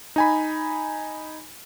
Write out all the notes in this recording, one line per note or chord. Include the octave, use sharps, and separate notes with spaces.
D#4 G#5 B5